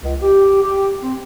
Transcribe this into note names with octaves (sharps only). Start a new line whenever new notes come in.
C#2
G4
G4
C4